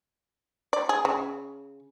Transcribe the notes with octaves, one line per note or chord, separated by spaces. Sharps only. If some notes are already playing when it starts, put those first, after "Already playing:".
D5
G#4
C#3